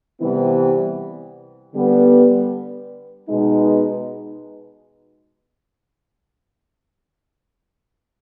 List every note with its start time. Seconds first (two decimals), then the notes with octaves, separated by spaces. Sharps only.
0.20 C3 E3 G3 B3 E4
1.74 D3 G3 B3
3.28 B2 G#3 B3 D#4